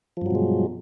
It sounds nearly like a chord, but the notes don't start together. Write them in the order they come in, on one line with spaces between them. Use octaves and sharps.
F3 G2 F#3 B2 G#3